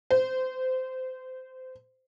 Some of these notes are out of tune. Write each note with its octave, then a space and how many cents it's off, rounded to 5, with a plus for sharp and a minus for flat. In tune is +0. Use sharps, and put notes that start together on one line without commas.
C5 -25